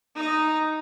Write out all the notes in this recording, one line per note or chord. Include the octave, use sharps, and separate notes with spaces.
D#4 D#5